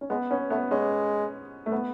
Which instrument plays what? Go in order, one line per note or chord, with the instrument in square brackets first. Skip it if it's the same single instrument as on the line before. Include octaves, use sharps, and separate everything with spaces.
[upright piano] C#4
[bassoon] G#3 [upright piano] B3
[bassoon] B3 [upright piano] C#4
[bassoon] A3 [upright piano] B3
[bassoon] G#3 [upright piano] C#4
[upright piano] A3
B3